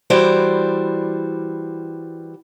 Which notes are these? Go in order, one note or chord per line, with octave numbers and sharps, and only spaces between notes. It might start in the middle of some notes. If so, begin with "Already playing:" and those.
E3 G3 E4 F#4 C5 D5